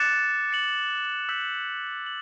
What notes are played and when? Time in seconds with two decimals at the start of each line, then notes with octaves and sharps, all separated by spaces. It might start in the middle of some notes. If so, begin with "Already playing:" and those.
Already playing: D6 F#6 A6 C#7 E7
0.50 A6 C#7 F#7
1.29 E6 G6 B6 F#7
2.06 F#7